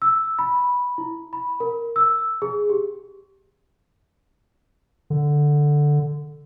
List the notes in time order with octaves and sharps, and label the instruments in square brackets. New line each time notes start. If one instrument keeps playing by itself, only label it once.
[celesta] E6
B5
E4
B5
A#4
E6
G#4
G4
[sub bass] D3